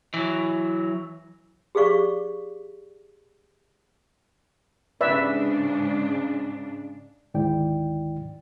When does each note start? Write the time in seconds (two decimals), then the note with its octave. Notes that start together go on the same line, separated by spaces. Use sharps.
0.14 E3 F#3
1.75 G4 G#4 D5 F5 C#6
5.01 G#2 C#3 D4 B4 D5 E5
7.34 D2 G#2 D#3 E4 D5 G5